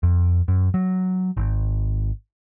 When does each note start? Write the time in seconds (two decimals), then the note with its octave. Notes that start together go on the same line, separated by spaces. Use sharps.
0.03 F2
0.48 F#2
0.74 F#3
1.37 G#1